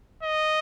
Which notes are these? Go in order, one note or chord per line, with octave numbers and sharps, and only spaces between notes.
D#5